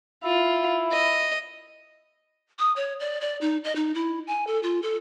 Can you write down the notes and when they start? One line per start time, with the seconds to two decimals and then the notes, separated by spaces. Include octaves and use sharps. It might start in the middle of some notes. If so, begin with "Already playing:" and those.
0.24 E4 F4
0.92 D#5
2.59 D#6
2.76 C#5
3.00 D5
3.21 D5
3.41 D#4
3.64 D#5
3.76 D#4
3.95 E4
4.27 G#5
4.47 A4
4.63 F4
4.82 A4